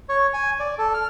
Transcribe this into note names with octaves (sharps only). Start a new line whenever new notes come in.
C#5
G#5
D5
A4
F6